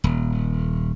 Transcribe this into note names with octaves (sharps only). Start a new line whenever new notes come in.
D#1